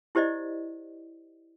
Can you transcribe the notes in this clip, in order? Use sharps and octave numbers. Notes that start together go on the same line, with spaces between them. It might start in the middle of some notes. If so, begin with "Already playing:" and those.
E4 G4 C5 D5 D#5